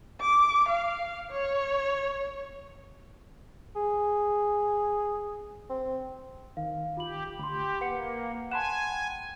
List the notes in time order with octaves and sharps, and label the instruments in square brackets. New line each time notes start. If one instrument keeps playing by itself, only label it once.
[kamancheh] D6
F5
C#5
[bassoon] G#4
C4
[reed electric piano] D#3 [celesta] F5
[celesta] F4 B5 F#7 [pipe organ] G4
[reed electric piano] D2 [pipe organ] G4 [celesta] B5 C6
[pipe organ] A#3 [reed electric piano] B4 [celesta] F#5 C#7
[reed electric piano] F#5 B5 C6 [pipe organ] G#5 [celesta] A5 E7
[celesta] G5